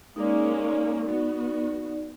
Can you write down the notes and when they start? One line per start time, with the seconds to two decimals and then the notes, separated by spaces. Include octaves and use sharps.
0.16 G#3 A#3 C#4 D#4 D5
1.08 B3 F#4